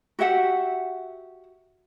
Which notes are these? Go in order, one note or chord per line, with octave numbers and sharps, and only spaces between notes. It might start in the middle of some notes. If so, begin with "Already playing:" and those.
F#4 G4 E5 F#5